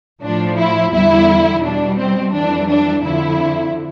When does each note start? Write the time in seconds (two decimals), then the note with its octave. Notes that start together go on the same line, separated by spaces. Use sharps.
0.23 A2 F3 D4
0.58 E4
0.94 E2 D3 G3 E4
1.64 B2 G3 D4
1.99 C4
2.34 F2 E3 G3 D4
2.70 D4
3.05 F2 D3 F3 E4